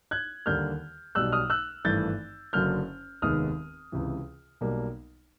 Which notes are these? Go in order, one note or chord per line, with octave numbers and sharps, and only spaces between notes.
F#6 G#6
D#2 D3 G3 A#3 F6 G6
B1 B2 G3 E6 F#6
D#6 F6
E6 F#6
G#1 G2 E3 A3 G6 A6
F#1 F#2 D3 F#3 A#3 F6 G6
F1 D#2 D#3 G#3 B3 D#6 F6
C#2 C3 E3
B1 B2 G3 A#3